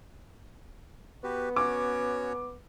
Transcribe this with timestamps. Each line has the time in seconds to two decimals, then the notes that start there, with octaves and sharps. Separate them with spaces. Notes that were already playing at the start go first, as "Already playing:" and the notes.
1.23 B3 F#4 G4 B4
1.56 C#4 F#4 C#5 D6